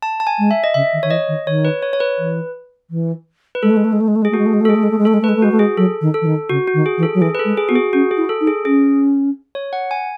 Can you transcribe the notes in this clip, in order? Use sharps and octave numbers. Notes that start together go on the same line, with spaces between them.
A5
A5
G#5
G#3
E5
D#5
C#3 E5
D#3
D#3 C#5
E3 D#5
D#3
D#3 C#5
B4
C#5
C#5
B4
E3
E3
B4
G#3 A4
A3
G#3
A3
G#3
A3
G#3
A3
G#3 G#4
A3
G#3 F#4
A3
G#3
A3
A4
G#3 G#4
A3
G#3
A3
G#3
A3 A4
G#3
A3
B4
G#3
A3
G#3 F#4
A3
G#3 G#4
F#3 A4
D#3
A4
E3
D#3
C#3 F#4
F#4
D#3
G#4
E3
A4
F#3
E3 G#4
B4
A4
G#3
G#4
B3 F#4
G#4
C#4 F#4
G#4
E4
A4
D#4
G#4
C#4 G#4
C#5
F#5
G#5